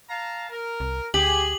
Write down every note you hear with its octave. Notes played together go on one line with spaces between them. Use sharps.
F5 A5 A#5
A#4
C2
D2 G4 G#4 F#7